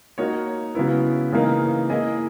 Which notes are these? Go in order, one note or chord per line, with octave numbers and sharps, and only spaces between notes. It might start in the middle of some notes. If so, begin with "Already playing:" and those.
A#3 D#4 F#4 C#5
C#3 F#3 B3 E4
C#3 E3 A#3 D#4
A#3 E4 G#4 D#5